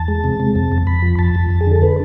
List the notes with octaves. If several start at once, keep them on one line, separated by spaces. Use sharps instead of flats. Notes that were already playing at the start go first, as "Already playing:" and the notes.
Already playing: E2 A5
G#3
C3
C3
F2
F2
F2 B5
F3
F2 A5
F2
F2
G#4
D3 A4
B4